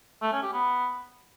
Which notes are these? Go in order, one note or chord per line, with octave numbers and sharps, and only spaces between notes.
A3
C#4
G4
B3